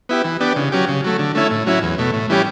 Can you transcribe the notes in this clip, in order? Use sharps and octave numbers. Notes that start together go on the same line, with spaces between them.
B3 E4 G4
E3
B3 D4 G4
C#3
F#3 C#4 G4
C#3
F#3 A3
D3
A3 C#4 E4
A2
F#3 C#4 E4
E2
B2 A3
A2
E3 G3 C#4 G4